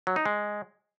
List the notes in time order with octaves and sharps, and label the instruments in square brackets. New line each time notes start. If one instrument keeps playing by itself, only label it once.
[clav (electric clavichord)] F#3
D#4
G#3